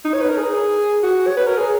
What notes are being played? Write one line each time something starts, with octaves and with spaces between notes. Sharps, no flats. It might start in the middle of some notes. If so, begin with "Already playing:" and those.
D#4
C#5
B4
A#4
G#4
F#4
C#5
B4
A#4
G#4